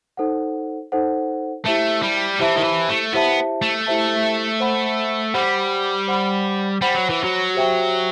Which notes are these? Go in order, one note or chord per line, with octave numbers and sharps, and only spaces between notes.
D#4 A4 C5 F#5
D#4 A4 C5 F#5
A3 E4 G4 C5 E5 A5
G3
E3 E4 G4 C5 E5 A5
D#3
E3
A3
B3 E4 G4 C5 E5 A5
A3
E4 G4 C5 E5 A5
C5 F#5 B5
G3 C5 F#5 B5
C5 F#5 B5
G3 C5 F#5 B5
F#3
E3
F#3
G4 C5 E5 G5